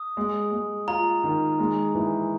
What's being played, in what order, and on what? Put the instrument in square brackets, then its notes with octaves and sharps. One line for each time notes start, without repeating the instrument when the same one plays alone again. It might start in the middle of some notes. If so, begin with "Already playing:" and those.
Already playing: [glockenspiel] D#6
[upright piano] G#3
G#3
[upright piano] F4 [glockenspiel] A#5
[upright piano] D#3
G#3
E3